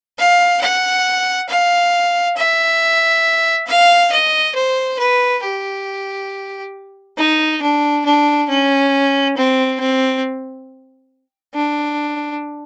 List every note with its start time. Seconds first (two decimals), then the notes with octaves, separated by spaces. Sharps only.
0.18 F5
0.61 F#5
1.49 F5
2.37 E5
3.67 F5
4.12 D#5
4.55 C5
4.99 B4
5.43 G4
7.17 D#4
7.62 D4
8.05 D4
8.49 C#4
9.37 C4
9.80 C4
11.55 D4